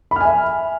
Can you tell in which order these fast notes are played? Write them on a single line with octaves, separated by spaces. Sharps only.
B5 F6 G#5 E5